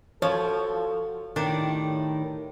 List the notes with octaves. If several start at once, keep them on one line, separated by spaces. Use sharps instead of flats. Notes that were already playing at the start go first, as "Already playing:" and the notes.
F3 F4 F#4 A4 C#5
A2 D#3 D4 G4